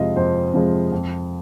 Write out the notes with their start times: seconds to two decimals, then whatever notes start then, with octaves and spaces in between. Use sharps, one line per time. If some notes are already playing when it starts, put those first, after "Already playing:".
Already playing: F2 C3 F3 G#3 D#5 F5
0.16 F2 C5
0.54 C3 F3 G#3
0.92 F2